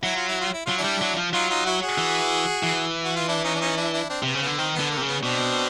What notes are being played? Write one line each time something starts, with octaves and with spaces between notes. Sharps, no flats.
F#3 E4
F4
E4
F4
E4
F#3 F4
D4 E4
G3
F#3
F3
F#3 D#4 F4
D#4 F4
E4 F#4
F#4 G#4
E3
E3
F#4
F4
D4 E4
C#4 D#4
D4
C#4 D#4
D4 E4
D4 E4
C4 D4
C3 B3
C#3 C4
B3
D3
D#3 C4
D3 B3
A#3
C3
C#3
B3
B2 C4 D4